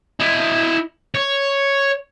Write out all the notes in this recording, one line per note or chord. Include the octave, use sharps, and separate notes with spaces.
E4 D#5
C#5